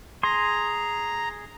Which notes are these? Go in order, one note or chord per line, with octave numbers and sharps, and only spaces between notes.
G#4 A#5 C6